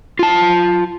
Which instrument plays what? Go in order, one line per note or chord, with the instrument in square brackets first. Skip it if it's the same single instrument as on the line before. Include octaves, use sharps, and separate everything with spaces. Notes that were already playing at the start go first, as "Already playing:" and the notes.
[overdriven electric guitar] F4 A5